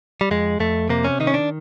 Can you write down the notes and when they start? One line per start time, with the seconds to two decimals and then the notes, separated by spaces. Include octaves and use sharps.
0.21 G3
0.31 F2 G#3
0.60 F2 A3
0.89 C3 A#3
1.04 C#4
1.20 D#3 D#4
1.27 C#4
1.34 D4